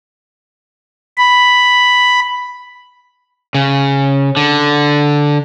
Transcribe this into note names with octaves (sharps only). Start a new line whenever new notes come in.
B5
C#3
D3